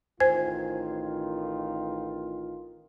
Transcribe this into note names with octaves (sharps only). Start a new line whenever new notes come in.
A1 D#3 F4 C5 G#5 G#6